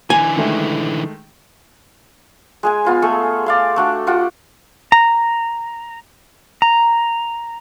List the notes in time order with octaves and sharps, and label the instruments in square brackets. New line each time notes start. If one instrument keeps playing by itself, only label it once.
[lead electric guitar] D3 E3 [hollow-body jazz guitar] G#5
[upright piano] D#3 G#3 A3
[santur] G#3 G#4 G#5
B3 F4 B4
A3 G#4 A4 C#6
D5 F5 C6
A3 D4 F#4
F4 G4 F#5 G5
[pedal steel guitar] A#5
A#5